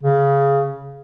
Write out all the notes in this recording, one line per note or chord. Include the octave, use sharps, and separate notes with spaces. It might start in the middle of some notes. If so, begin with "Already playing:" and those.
C#3